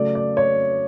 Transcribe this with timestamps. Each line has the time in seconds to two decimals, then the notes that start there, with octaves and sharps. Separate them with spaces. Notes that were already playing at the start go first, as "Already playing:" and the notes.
Already playing: C#3 F#3 A3 D5
0.15 D5
0.37 C#5